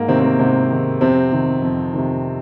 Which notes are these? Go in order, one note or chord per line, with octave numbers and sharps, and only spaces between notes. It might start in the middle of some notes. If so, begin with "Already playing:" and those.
Already playing: G#2 A#3
C3 D#3 C4
C4
A#3
G#2 C3 C4
D#3
F2 C3 C4
C3 D#3
F2
C3 D#3